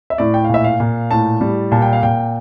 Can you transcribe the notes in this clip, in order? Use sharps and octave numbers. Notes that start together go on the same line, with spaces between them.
E5
A2 D5
G5
F5
A#2 E5
F5
A#2
A2 A5
G3
A#2 A5
G5
F5
A#2 G5